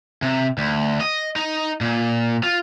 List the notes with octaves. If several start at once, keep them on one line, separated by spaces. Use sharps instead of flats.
C3
D2
D#5
D#4
A#2
F4